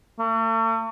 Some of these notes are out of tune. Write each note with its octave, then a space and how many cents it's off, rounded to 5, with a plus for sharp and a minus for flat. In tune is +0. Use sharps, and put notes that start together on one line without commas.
A3 +45